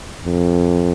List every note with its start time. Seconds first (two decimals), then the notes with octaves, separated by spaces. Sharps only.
0.24 F2